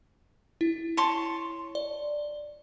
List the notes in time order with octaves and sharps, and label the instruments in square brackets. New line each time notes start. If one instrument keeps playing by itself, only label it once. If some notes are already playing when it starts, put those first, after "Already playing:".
[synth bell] E4
[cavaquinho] C#5 A5 C6
[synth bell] D5